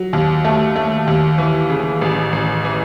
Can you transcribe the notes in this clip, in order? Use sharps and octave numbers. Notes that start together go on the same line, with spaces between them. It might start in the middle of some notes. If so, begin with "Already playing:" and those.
Already playing: F#3
D#2
A3
A3
D#2
E3
C#3
A1
A1
E3